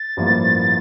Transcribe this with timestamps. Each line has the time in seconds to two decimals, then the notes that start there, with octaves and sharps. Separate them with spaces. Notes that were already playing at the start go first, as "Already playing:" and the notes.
Already playing: A6
0.17 A1 G2 F3 A#3 E4